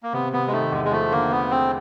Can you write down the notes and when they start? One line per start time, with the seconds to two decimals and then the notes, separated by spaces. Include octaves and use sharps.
0.03 A#3
0.13 C3 B3
0.33 C3 B3
0.47 G#3
0.52 D#3 A3
0.72 E2 G#3
0.85 G#3
0.92 F3 A3
1.11 D3 A#3
1.31 A3 B3
1.51 A3 C4